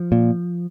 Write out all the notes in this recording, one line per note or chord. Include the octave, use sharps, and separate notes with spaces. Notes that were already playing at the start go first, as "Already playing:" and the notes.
Already playing: F3
A#2